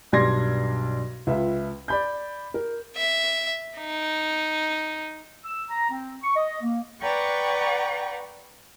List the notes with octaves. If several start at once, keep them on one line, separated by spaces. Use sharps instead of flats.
B1 G2 D5 C6 G#6 A#6
C#2 F4 B4 E5
D5 B5 G6
A#4
E5
D#4
E6
A#5
C4
C#6
D#5
A#3
B4 D5 F#5 G5 A#5 C#6